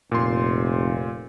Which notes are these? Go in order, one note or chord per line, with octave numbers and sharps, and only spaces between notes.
F1 A#2 C6